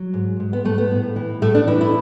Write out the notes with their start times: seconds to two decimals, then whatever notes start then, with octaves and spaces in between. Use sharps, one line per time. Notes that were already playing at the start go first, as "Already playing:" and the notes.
Already playing: F#3
0.14 G#2
0.40 G#2
0.53 B3
0.65 G#2 A3
0.78 B3
0.91 A2
1.16 E3
1.42 A2 A3
1.55 D4
1.67 E3 E4
1.81 E4